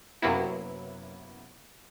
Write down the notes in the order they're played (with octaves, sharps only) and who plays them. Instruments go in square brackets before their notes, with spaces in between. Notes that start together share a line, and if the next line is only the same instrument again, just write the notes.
[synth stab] F#2 C3 F#3 A#3 B3 E4